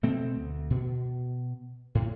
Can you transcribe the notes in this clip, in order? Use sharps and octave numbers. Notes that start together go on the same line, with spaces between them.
B2 A3 C4
D2
B2
A2